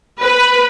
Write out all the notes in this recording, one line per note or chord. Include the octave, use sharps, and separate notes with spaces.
B4